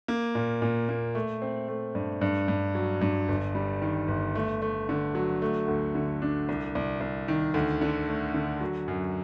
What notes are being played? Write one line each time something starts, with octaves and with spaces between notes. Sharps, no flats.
A#3
A#2
A#2
A#3
A3
C4
A3
G2
G2
G2
F#3
G2
G1
G3
D#3
G1
A3
A3
D3
F#3
A3
D2
D3
D4
C2
C2
C2
D#3
D2
D3
A3
D3
F#3
F#2